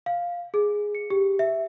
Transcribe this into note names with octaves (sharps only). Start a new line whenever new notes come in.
F5
G#4
C#7
G4
E5